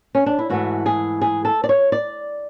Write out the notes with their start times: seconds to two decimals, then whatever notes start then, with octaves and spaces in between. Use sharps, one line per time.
0.15 C#4
0.26 D4
0.39 E4
0.50 G#2 E3 A3 F#4
0.86 G#4
1.21 G#4
1.45 A4
1.64 D5
1.69 C#5
1.92 D5